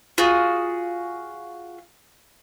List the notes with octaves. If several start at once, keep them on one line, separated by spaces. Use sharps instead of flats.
F4 F#4 G#4